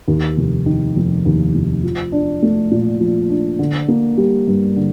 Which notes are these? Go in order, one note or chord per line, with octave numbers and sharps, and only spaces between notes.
D#2
F1
D#3
F1
D#2
F1
F3
D4
A3
A#2
F3
D4
D3
A#3
G3
G2
D3